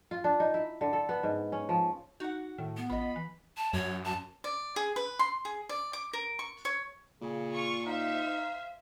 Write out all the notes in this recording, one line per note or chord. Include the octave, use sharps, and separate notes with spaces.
F4
D4
D#4
E4
D3
A4
B3
G#2
C#4
F3
D#4 F#4 F#5
A2 D#3
B3
A1 F4 D#5 B5
E3
A5
F#2 C#5
A5
D5
G#4
B4
C6
G#4
D5
D6
A#4
C#6
C#5
A#2 C#3
F4 C#6
D#4 C5 E5 F5